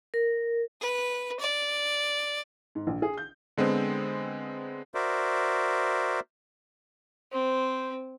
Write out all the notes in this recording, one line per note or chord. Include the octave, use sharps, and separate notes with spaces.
A#4
B4
D5
G#2
A#1
G#4
G6
D3 G#3 B3 C4
F#4 A#4 C5 D5 E5
C4 C5